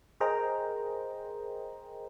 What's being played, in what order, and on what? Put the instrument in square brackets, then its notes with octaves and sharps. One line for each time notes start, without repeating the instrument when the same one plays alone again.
[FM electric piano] G#4 A#4 C5 D#5 G5 A#5